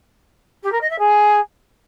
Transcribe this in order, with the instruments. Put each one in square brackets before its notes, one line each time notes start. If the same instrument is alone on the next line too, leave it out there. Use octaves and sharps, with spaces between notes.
[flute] G4
A#4
D#5
E5
G#4